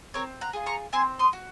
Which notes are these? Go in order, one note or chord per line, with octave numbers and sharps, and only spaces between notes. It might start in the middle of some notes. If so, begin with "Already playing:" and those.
C4 A#4 C#5
F#5 A#5
F4 G#4
A#5 C#6
C4 G#5 C6
C6 D#6
F#4